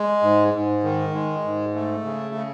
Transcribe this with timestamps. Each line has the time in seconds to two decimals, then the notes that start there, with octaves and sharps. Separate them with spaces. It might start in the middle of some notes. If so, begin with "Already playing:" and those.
Already playing: G#3
0.22 G#2
0.54 G#2
0.84 D#3
1.13 G#3
1.44 G#2
1.74 A3
2.04 C#3
2.35 C#3